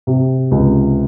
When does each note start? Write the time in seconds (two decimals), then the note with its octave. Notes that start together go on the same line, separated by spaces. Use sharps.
0.07 C3
0.51 C#2